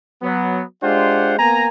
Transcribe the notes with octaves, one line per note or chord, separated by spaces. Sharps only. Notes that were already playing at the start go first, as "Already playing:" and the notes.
F#3 B3
G#3 D4 F4 G4 C5 F#5
A#3 B3 G#5 A#5